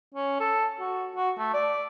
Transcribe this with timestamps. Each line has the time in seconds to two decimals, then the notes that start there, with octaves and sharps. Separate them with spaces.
0.14 C#4
0.40 A4
0.79 F#4
1.16 F#4
1.38 A3
1.53 D5